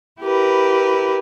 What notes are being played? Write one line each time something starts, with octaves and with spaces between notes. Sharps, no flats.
E4 G4 A#4 B4